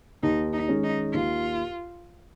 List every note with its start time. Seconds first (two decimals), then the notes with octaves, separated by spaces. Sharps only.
0.23 D#2 D#4
0.53 D#4
0.68 D#3 G#3 C#4 G#4
0.83 D#4
1.14 D#2 F4